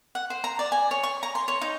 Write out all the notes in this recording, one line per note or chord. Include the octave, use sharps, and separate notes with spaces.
F#5
C5
A#5
D5
G#5
C#5
C#6
A#5
C6
C#5
D#4